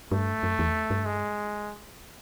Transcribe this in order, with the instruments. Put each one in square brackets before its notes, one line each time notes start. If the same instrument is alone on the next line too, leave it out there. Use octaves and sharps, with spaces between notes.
[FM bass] G2 [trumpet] A3
[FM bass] F#2
E2
G2
[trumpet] G#3